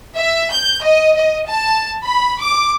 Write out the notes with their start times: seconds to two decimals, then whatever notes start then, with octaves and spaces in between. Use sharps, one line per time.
0.15 E5
0.52 G6
0.83 D#5
1.16 D#5
1.48 A5
2.05 B5
2.41 D6